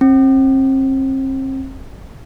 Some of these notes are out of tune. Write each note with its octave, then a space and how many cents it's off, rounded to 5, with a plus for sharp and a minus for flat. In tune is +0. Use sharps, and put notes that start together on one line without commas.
C4 +35